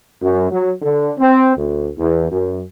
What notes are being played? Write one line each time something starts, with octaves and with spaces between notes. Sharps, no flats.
F#2
F#3
D3
C4
D2
E2
F#2